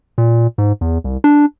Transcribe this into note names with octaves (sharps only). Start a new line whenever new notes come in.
A#2
G#2
E2
C2
D4